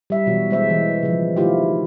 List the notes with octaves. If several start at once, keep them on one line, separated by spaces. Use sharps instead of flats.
G3 E5
B2 E3 F#3 F#4
G#3 C5 E5
E3
C#3 F3
D#3 A3 E4 F4 G4